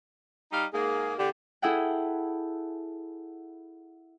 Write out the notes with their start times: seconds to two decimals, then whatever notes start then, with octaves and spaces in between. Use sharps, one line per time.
0.52 G3 D#4 F5
0.73 G#2 A#3 G#4
1.18 E2 D3 G4
1.62 E4 G#4 A4 E5 F#5 G5